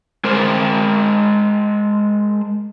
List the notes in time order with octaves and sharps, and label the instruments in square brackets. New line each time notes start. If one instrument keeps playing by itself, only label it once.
[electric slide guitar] G#3 A#4 C5